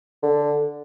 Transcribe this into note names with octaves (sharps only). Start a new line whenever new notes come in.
D3